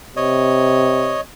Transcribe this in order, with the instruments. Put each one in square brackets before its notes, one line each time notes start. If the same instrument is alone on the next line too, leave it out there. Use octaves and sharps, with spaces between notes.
[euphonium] C3 [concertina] C#5 D#5